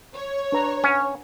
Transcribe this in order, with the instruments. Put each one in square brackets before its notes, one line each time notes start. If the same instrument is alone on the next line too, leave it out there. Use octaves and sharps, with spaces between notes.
[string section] C#5
[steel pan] D4 B4 A#5
[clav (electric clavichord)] C#4 [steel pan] F#5 G#5